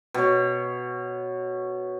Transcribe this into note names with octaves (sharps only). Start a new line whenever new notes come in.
B2 C#5